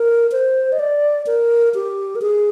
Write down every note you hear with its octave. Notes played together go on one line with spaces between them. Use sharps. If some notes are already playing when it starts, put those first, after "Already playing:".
Already playing: A#4
C5
D#5
D5
A#4
G4
A#4
G#4